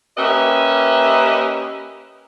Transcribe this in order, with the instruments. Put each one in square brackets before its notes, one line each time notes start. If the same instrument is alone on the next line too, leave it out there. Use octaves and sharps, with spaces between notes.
[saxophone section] A#3 C#4 G4 B4 D#5 E5